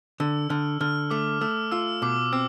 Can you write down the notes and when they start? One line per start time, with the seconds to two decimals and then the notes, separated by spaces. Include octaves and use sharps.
0.20 D3 E6
0.50 D3 F6
0.81 D3 F6
1.10 A3 D6
1.41 A3 E6
1.72 F4 E6
2.02 B2 D6
2.33 C4 E6